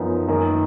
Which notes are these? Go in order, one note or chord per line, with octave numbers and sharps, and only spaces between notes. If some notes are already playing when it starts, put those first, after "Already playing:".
Already playing: F#2 F3 B3 D#4
F#2 D#3 A#3 D#4